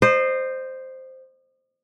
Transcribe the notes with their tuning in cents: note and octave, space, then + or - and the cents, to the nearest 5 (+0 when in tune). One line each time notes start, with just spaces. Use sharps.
C5 +0 D#5 -35